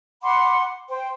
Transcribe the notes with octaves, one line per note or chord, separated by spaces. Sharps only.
F#5 B5 C6 D6
C5 G5